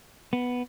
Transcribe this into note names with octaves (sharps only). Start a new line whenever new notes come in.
B3